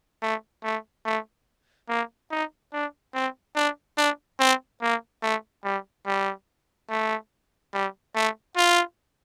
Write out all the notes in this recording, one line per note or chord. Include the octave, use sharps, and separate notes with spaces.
A3
A3
A3
A#3
D#4
D4
C4
D4
D4
C4
A#3
A3
G3
G3
A3
G3
A3
F4